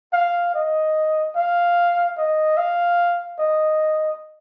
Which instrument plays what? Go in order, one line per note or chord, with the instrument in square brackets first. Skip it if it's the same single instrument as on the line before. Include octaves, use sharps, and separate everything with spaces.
[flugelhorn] F5
D#5
F5
D#5
F5
D#5